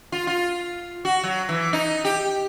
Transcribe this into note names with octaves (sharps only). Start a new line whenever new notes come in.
F4
F4
F#4
F#3
E3
D#4
G4